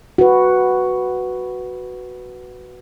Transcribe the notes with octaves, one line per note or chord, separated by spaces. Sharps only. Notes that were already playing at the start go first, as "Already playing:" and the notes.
F#4 B4